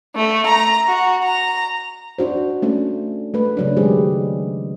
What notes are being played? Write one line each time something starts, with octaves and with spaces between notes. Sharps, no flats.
A3
A#5
F#4
A#5
D4 F#4 C5
A3 C#4 D4
A3 B4
C#3 F#3 D4
D#3 G#3 G4 G#4 C5